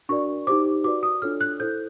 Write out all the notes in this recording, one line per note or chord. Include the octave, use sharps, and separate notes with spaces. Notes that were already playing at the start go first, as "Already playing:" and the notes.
D4 F#4 A#4 D5 C#6
D#4 G4 C5 D6
F#4 B4 D5 D6
D#6
D4 F4 A4 C#5 F6
F#6
E4 A4 C5 G6